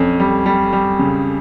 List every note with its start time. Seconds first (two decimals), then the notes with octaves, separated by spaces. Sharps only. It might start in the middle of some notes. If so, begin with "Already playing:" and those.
Already playing: F2 C#4
0.20 G3
0.46 G3
0.73 G3
0.99 C#3